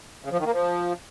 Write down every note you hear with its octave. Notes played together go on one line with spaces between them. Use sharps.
C#3
F3
D#3
A#3
F3